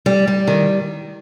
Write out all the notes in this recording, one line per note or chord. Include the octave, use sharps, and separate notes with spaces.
G3
G3
D#3